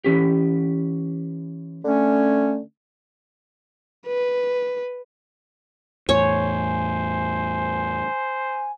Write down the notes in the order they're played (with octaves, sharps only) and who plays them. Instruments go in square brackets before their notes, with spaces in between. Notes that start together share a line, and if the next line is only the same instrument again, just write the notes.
[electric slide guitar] E3 C#4 G4
[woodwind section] D3 A3 C#4
[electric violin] B4
[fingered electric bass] E2 A2 [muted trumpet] C5 [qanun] C#5 [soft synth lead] G#5